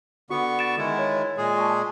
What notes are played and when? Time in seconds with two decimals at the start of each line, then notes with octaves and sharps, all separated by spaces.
0.30 D3 B3 F#4 C#6
0.59 A6 D7 E7
0.78 D#3 G#3 E4
0.99 C#5
1.37 A#2 G#3 G#4
1.58 A5 C#6